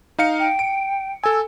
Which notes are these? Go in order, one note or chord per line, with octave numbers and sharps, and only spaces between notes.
D#4 F5 C#7
G5
D7
A4 G#5 E6